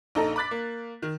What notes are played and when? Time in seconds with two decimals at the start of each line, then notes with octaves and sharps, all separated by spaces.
0.15 A#1 D#4 A4 A#5
0.36 B5 D6 F#6 A6 B6
0.51 A#3
1.02 D#3